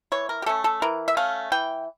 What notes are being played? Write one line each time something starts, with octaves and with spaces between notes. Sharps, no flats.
E3 C#5
A#4
G4
A3 C#4 A4
A4
E3 A#4
E5
A3 C#4 F5
E3 G5